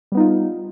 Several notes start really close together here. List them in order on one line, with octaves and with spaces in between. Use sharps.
G3 B3 D#4 F4